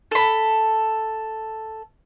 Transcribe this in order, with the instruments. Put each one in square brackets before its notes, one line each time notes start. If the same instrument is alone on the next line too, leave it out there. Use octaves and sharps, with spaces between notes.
[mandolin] A4 B5